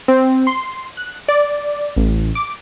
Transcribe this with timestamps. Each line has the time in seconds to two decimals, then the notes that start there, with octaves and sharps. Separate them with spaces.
0.08 C4
0.47 C6
0.97 F#6
1.28 D5
1.96 A1
2.35 D6